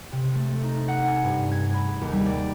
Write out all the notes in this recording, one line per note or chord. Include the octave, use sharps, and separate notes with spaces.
C3
A3
D#4
F#5
G#5
G2
G#6
B5
G#4
D#2
G3
D5